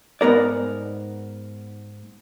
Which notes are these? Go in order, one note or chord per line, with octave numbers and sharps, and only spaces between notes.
G#2 B3 A#4 D5